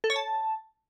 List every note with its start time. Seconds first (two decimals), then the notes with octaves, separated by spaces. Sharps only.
0.04 A4
0.10 C#5
0.16 A5